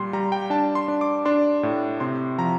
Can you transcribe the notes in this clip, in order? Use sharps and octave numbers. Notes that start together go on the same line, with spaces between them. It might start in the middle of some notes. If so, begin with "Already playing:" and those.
Already playing: A#2 G3 C6
G3 A#5
G5
D4 A5
C6
D4
D6
D4 C6
A2
C3 C6
F3 A#5